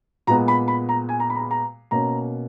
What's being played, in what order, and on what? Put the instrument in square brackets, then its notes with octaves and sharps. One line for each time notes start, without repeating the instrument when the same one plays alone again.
[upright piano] A#2 G#3 B3 A#5
B5
B5
A#5
G#5
A#5
B5
A#5
B5
A#5
B2 A#3 C#4 A#5